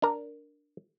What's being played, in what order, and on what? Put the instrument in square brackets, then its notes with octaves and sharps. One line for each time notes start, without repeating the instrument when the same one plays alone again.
[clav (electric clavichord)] D4 A#4